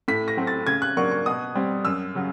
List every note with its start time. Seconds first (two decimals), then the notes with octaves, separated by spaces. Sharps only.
0.08 A2 B6
0.28 A#6
0.37 F#3 A3 C4
0.47 A6
0.67 C#3 G#6
0.82 F#6
0.97 F#3 A#3 D4 C#6
1.11 C#6
1.26 B2 D#6
1.55 G3 C4
1.85 F#2 E6
2.15 C#3 F#3